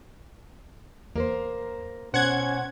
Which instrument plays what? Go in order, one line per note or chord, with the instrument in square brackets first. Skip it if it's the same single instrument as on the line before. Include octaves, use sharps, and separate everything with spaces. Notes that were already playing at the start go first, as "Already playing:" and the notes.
[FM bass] E2 [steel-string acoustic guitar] A#3 A#4 C5
[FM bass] B2 [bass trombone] C#4 [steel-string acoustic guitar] C5 [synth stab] F#5 G#6